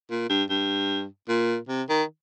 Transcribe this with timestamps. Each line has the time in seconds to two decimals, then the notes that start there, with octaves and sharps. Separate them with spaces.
0.11 A#2
0.30 G2
0.49 G2
1.29 A#2
1.69 C3
1.89 D#3